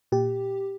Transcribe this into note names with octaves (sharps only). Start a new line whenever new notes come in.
A#2 G4